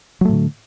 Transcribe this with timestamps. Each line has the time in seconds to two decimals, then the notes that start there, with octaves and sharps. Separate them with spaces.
0.21 F#3
0.25 A3
0.29 A2
0.33 D3